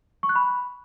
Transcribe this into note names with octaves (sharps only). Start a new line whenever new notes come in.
C#6
F#6
B5